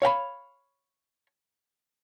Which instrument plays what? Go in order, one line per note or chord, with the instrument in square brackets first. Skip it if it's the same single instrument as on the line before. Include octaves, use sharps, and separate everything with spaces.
[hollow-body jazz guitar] C#5 F5 G5 B5